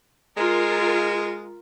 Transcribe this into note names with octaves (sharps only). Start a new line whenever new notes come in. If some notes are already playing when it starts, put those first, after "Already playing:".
G#3 F4 A#4